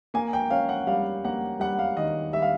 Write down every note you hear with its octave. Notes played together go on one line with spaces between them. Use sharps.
A#3 G#5
G5
C#4 F5
F#5
G3 F5
A#3 F#5
G3 F#5
F5
D#3 D#5
G3 E5
F5